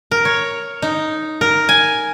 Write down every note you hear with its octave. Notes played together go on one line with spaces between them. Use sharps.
A#4
C#5
D#4
A#4
G#5